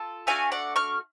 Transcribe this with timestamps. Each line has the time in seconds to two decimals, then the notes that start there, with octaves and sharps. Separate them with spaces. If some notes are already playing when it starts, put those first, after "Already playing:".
Already playing: F4 A4
0.27 A3 D4 F#4 F5 G#5
0.52 D5 F#5
0.76 C#6 F6